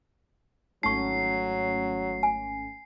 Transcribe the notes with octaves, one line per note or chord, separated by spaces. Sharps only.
G#1 F#3 A3 C#4 D#4 C#6 C7
G#5